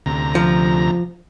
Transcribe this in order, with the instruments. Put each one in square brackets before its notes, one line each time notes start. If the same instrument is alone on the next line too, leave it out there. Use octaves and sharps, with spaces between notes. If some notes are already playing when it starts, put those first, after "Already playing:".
[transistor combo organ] D2 C3 A#5
[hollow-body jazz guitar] F3